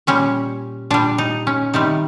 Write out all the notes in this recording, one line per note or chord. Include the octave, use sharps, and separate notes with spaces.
A#2 G3 C#4
A#2 G3 D4
D#4
C#4
C3 D#3 G3 D#4